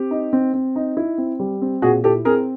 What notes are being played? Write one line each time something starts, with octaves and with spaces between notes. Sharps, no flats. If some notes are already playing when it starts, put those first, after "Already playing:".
Already playing: C4 G4
D#4
C4
C4
D#4
E4
C4
G3
C4
A#2 F#4 G#4
E4 G4 A4
C4 G#4 A#4